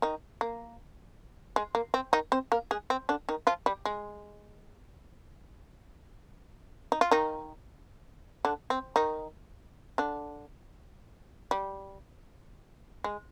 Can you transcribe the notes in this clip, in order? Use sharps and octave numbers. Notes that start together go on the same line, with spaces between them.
D#3 D#4
A#3
G#3
A#3
C4
D#3 D#4
C4 C5
A#3 A#4
G#3 G#4
C4
D3 D4
D#3 D#4
F3 F4
G3
G#3
D#4
F4
D#3 D#4
D3 D4
C4
D#3 D#4
D3 D4
G3
G#3